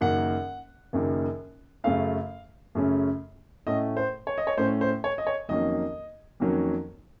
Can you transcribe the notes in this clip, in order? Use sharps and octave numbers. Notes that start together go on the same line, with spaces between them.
F#1 F#2 D#3 A#3 F#5
F#1 F#2 D#3 A#3
F#2 C#3 A3 C#4 F5
F#2 C#3 A3 C#4
A2 A3 C#4 D#5
C5
C#5
D#5
C#5
A2 A3 C#4 C5
C5
C#5
D#5
C#5
F2 D#3 F#3 A#3 C#4 D#5
F2 D#3 F#3 A#3 C#4